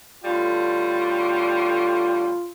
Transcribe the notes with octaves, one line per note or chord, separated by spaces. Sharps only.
A2 D3 G3 F4